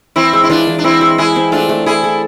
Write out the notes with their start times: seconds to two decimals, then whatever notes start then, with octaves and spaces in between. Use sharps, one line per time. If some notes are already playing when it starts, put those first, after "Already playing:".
0.16 E3 C4 E4
0.33 G#3
0.44 E4
0.50 E3 D4 F4
0.67 E3
0.79 D4
0.84 E3 C4 E4
1.01 G#3
1.18 G#3 E4 G#4
1.36 C4
1.52 A3 D4 F4
1.69 A3
1.86 E4 G#4 A4
2.04 A4